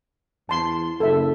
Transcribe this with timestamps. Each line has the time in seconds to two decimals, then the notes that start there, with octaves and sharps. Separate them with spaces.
0.49 E2 A5 C6
1.00 F#1 A4 E5